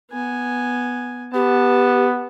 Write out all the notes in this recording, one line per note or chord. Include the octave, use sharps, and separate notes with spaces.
B3 G#5
B3 G4 A5